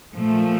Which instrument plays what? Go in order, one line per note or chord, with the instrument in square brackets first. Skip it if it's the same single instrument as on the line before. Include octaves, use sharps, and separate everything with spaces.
[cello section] A#2 F3 A3